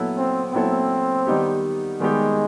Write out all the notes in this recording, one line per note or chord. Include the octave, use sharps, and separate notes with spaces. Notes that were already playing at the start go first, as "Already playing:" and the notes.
Already playing: A#2 F#3 B3 E4 A4
C4
A#2 F#3 B3 C4 E4 A4
D#3 G3 B3 D#4 G4
D#3 G3 G#3 B3 D#4 G4